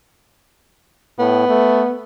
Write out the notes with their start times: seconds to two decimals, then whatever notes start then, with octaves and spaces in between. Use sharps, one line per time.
1.19 A2 B3
1.48 A3